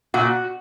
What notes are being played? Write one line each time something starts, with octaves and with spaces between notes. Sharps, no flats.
A#2 F#4